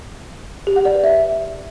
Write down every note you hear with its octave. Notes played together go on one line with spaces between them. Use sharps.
G4
F#5
D5
B4
E5